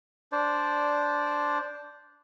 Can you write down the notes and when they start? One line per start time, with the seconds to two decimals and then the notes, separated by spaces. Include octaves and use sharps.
0.32 D4 C5 D5